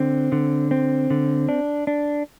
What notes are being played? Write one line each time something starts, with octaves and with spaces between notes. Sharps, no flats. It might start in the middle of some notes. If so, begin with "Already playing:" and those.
Already playing: D3 C4
D3
C4
D3
D4
D4